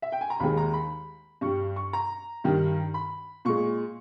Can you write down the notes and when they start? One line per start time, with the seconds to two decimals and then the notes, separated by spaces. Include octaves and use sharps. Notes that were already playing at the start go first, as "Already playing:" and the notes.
0.02 E5
0.12 G5
0.21 G#5
0.30 A#5
0.40 D#2 D#3 G#3 B5
0.57 A#5
0.73 B5
1.41 G2 G3 C#6
1.76 C#6
1.93 A#5
2.44 G2 D#3 G3
2.94 B5
3.45 A#2 G#3 C#6